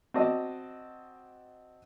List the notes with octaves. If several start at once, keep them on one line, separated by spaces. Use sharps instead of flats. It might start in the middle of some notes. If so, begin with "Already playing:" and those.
C4 F#4 D5 D#5 A5